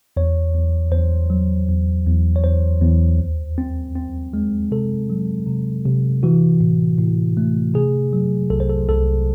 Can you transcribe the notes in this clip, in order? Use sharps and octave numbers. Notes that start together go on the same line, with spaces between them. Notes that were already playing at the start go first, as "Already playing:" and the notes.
E2 C#5
E2
E2 C5
F#3
E2
E2
C#5
E2 C5
E2
D#2
C4
C4
G#3
C3 A4
F#3
C3
C3
E3 F#4
A2
A2
A3
C3 G#4
F#3
C2 A4
C5
A4
C2 A4